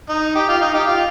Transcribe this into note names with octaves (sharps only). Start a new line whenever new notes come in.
D#4
G4
F4
D#4
G4
F4